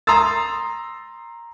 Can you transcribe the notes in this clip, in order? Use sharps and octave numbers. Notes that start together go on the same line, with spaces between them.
A#5 C6 D#6 E6 A6